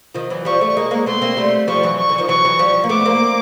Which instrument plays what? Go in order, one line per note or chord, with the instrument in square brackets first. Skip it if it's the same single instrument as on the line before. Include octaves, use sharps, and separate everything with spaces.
[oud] D#3 F3
E3 F#3
[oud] F3 G3 [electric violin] C#6
[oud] G3 A3
G#3 A#3
G#3 A#3
[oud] A3 B3 [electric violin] C6
[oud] A#3 C4
G3 A3
[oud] F3 G3 [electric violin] C#6
[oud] E3 F#3
[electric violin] C#6
[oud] D3 E3
D#3 F3
[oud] E3 F#3 [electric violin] C#6
[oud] E3 F#3
F3 G3
A#3
[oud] A3 B3 [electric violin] D6
[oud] A#3 C4